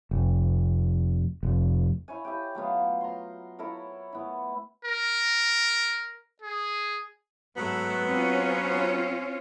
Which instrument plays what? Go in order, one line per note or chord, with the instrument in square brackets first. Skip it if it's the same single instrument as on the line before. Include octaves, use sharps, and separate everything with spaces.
[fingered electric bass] F1
F1
[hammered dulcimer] E4 C#5 G#5
E4 G4 G5
F#3 A3 B3 F4
A#5 C6
E4 A4 A#4 C#5
A3 B3 E4
[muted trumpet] A#4
G#4
[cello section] G#2 A3 [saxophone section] F#3 B3
[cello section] C4 C#4 F4